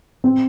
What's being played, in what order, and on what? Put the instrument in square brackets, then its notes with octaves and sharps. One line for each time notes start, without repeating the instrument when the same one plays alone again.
[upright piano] C4